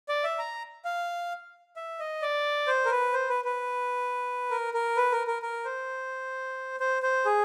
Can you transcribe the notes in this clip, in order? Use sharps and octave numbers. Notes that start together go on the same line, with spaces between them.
D5
E5
A#5
F5
E5
D#5
D5
C5
A#4
B4
C5
B4
B4
A#4
A#4
B4
A#4
A#4
A#4
C5
C5
C5
G#4